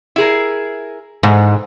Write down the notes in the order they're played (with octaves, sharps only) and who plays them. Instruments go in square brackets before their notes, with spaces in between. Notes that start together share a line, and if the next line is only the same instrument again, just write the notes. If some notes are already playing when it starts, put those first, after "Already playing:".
[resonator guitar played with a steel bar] E4 G#4 A#4
[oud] G#2 [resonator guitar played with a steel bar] E3